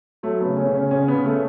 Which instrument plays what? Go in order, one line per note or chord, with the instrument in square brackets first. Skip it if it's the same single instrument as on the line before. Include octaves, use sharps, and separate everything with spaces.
[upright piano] F#3 A3
C#3 B3
C#4
C#3
C#4
C#3 C#4
B3
C#3
A3